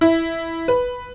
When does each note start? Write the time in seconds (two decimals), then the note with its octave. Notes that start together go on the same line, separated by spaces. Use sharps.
0.01 E4
0.68 B4